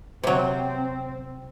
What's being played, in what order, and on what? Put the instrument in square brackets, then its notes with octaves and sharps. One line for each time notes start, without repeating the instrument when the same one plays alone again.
[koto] C3 F#3 [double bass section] C4